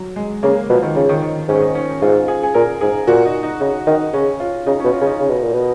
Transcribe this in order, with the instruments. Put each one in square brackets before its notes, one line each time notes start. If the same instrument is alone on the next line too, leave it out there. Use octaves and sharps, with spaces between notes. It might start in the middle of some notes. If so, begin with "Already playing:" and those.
Already playing: [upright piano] F#3
G#3
[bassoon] C#3 [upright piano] A#3
[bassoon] B2 [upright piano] F3
[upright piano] D#3
[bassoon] C#3 [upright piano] F3
[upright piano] D#3
D#3
[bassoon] G#2 [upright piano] C#4
[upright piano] D#4
C#4
[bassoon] G#2 [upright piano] F4
[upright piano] G#4
G#4
[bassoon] A#2 [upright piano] A#4
[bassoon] G#2 [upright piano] G#4
[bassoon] A#2 [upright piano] F#4
[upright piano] D#4
D#4
[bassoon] C#3 [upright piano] D#4
[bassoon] D#3 [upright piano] D#4
[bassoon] C#3 [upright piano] C#4
[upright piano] F4
[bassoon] C#3 [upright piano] D#4
[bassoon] B2 [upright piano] C#4
[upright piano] F4
[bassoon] C#3 [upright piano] C#4
[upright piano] D#4
[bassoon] C#3
B2
A#2
B2